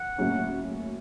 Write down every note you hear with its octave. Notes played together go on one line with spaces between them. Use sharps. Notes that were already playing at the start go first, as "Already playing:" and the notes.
Already playing: F#5
A2 F#3 A#3 C#4